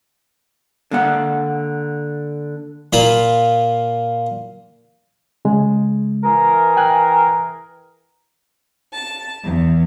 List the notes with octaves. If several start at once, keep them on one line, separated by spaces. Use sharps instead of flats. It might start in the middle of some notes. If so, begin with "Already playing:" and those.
D3 A#3 F#5
A#2 A#3 F4 B5
C#3 G#3
E3 G#4 A#4
G5 G#5 F#6
A5
E2